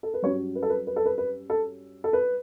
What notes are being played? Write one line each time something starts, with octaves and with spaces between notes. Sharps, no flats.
A4
B4
G2 F#3 C#4 C#5
B4
A4
B4
B4
A4
B4
B4
A4
A4
B4